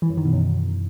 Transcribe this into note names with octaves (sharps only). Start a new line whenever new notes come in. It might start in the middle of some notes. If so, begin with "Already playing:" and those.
E3
F#2
D#3
B2
F#2